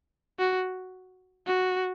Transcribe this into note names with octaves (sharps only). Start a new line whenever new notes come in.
F#4
F#4